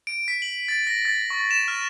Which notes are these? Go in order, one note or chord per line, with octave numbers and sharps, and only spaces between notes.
D7
B6
F#7
A6
A#6
A6
C#6
E7
F6